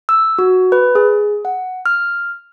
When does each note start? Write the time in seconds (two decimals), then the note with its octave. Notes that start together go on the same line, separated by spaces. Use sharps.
0.09 E6
0.39 F#4
0.72 B4
0.95 G#4
1.45 F#5
1.86 F6